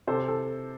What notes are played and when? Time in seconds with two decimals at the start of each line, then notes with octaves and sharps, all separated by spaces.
0.07 C3 A4 C5
0.28 A4